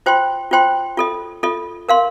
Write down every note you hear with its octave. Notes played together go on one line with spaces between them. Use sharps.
F4 C5 G5 C6
F4 C5 G5 C6
F4 A4 D#5
F4 A4 D#5
A#4 F5 C6